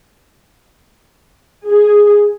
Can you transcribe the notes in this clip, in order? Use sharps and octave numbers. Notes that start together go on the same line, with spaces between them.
G#4